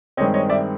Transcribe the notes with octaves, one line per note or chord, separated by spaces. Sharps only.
G2 D#3 G#3 C4 C#5 D#5
C#5 D#5
D5 E5